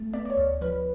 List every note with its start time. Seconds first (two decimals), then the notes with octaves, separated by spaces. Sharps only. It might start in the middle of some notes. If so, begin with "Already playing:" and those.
Already playing: A3
0.14 B3 D5
0.25 D5
0.30 C#5
0.37 D2
0.61 F3 B4